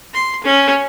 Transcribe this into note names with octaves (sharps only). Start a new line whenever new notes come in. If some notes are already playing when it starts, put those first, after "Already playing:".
C6
C#4